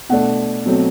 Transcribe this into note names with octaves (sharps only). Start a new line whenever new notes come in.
B2 A3 D4 F#5
B2 F#3 A3 C4